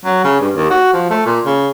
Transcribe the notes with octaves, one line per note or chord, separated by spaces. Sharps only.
F#3
C#3
G2
D#2
F#4
F3
A3
A#2
C#3